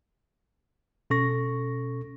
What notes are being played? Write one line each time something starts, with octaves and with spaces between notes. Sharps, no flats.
B2 C#4 A4 C#6 A#6